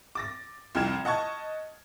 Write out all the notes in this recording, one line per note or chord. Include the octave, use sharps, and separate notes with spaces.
D6 A6 A#6
C2 F2 G5 F6 G#6 E7
D#5 F#5 A5 C#6 G#6